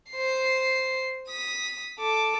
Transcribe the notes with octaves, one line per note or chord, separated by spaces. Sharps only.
C5 C7
D#6 B6
A4 D6